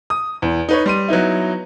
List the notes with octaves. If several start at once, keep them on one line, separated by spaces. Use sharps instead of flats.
D#6
E2
D#4 B4 C#5
G3 C6 D#7
F#3 B3 D#4 E4